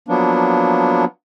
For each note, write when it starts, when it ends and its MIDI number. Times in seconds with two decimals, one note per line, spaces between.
0.08 1.05 53
0.08 1.05 54
0.08 1.05 58
0.08 1.05 59
0.08 1.05 62